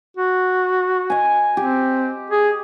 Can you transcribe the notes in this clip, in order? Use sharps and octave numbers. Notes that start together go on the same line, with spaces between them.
F#4
D#5 G#5
C4 G4
G#4